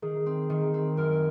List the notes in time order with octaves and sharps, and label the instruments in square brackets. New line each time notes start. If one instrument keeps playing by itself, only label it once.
[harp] D#3 [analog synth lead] G#4
[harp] C4
D#3
C4
[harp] F#2 [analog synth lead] A#4